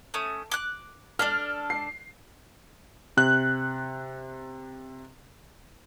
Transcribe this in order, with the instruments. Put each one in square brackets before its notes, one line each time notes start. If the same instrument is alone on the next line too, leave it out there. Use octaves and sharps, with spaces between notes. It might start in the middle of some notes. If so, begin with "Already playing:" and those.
[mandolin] A3 C#4 D#6
D6 F#6
[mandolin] D4 A4 D5 [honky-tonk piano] F6
[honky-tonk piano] C7
[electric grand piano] C3 F#6